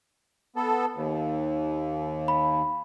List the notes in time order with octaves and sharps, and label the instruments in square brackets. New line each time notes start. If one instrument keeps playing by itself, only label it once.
[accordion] B3 A4
D#2
[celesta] B5